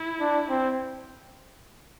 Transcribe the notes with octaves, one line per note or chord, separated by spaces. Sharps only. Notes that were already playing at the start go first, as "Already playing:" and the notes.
Already playing: E4
D4
C4